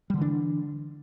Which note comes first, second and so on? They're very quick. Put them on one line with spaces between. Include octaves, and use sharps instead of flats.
G3 D3 E3 D4